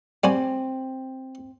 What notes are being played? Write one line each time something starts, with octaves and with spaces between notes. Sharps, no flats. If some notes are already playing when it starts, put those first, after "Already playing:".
G3 C4 F#4 G#5